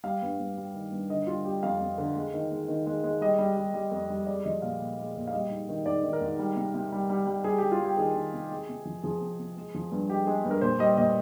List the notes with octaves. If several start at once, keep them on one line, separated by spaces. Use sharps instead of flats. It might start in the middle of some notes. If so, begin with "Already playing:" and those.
G3 F5
G2
G2
G3
D#3
G2
D3 D#5
G3 F4
G3 G4
F2 F5
F2
D3
G#3
D#3
G#3
D#3
G#3
G#3
G3 D#5
G3
G3
G3
F2
G3
G#3 D5
F3 D#5
A#2 F5
A#2
G#3
A#2
F5
G3 D#5
G#2
D#3
G#2 D5
D#3
A#4
G#2
G3
C3
C3
G3
G3
G3
G3 G#4
G3 G4
F4
G3 G4
D#3 G#4
D#3
C3
G#3
C3
F3
F3 G#4
C3
C3
G#3
F3
G2
G#3 G4
G#3 G#4
G2
A#4
A#2 C5
G3 D#5
A#2 D#5